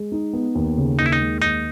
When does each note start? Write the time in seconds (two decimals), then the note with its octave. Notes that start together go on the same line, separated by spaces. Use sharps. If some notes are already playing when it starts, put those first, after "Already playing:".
Already playing: G#3
0.12 D#4
0.33 B3
0.55 D#2
0.77 C#3
0.98 D#2 D#4
1.06 E4
1.12 D#4
1.20 G#3
1.42 D#2 D#4